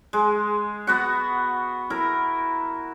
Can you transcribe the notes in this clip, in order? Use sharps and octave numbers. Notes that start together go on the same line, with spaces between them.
G#3
B3 F#4 F#5
E4 A#4